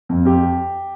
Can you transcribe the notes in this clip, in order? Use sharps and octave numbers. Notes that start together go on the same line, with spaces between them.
F2
F2 G4